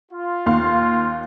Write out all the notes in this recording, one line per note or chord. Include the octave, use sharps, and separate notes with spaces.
F4
D#2 F5 C6